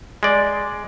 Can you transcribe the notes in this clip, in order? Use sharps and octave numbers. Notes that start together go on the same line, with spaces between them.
G#3 D5